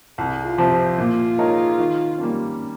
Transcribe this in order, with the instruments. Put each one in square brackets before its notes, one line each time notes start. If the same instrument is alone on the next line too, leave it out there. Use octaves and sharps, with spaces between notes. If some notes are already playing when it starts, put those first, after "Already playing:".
[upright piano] C2 [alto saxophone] G#4
[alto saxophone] F4
[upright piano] C3 F3 C4
[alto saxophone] F4
[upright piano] A#2
G#3 D#4 A#4 C#5
D#3
G3 A#3 C#4
[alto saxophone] C#4